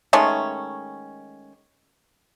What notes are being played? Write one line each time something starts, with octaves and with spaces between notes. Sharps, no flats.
D#3 G#3 A3 C#4